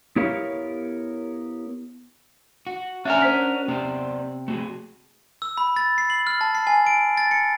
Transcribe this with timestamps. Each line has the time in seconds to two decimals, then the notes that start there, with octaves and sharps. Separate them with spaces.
0.16 B3 E4 G4 A#4 C#5 F5
2.67 F#4
3.05 C#4 D4 F#4 A#4 E5 G#5
3.22 C5 B6
3.68 C3 B3 C4 D5
4.48 A3 F#4 G#4
5.42 E6
5.57 B5
5.76 A6
5.98 C7
6.10 F#7
6.27 F6
6.41 A5
6.55 C7
6.67 G#5
6.87 D7
7.17 A6
7.31 C#7